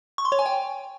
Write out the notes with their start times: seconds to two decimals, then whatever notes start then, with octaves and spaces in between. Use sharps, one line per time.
0.18 C#6
0.25 C6
0.32 C#5
0.39 G#5
0.46 G5